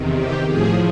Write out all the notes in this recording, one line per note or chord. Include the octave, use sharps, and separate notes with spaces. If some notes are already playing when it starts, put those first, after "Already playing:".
Already playing: E2 C3 D#3
G4
A2 F3 G#4